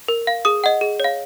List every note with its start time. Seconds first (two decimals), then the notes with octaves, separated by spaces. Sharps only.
0.08 A#4
0.27 F5
0.45 G#4 D#6
0.64 D#5 F#5
0.81 G#4
1.00 C#5 F5